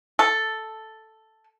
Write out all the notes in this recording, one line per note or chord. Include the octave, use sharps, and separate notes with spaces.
A4